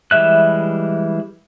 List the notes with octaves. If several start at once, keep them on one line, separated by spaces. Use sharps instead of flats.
E3 G3 G#3 E5 F#6